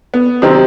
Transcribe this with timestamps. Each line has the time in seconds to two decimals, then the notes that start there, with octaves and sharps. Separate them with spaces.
0.14 B3
0.42 C3 D#3 F#3 C4